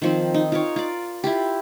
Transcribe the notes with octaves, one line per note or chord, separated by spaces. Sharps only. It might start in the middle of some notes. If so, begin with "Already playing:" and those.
D#3 F3 C4
D#4
F4 A#4 C#5
F4 D5
E4 F4 G4